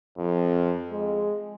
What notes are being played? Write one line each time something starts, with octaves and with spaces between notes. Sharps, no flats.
F2
G#3